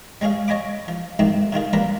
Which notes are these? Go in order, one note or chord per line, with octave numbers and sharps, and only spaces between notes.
G3 G#3 C#4 G#4 F5
C#5 D#5 G#5 B5 D6
F3
G#2 C3 D#3 A3 C4 G4
C3 D#3 F4 G#4
G3 A#3 D4 F4 A#4 B4